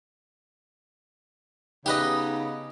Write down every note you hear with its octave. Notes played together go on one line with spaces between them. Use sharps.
C#3 B3 D#4 G4 B4 D#5